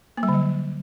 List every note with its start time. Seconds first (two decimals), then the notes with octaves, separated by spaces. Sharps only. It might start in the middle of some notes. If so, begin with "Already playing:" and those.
0.17 A#3
0.23 G3
0.29 D3
0.34 F#3